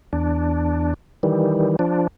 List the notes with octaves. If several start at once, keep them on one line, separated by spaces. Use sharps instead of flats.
E2 D4
D#3 E3 G3
F3 D4